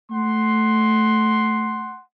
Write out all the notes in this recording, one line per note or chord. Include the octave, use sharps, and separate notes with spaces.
A3 F#5 C6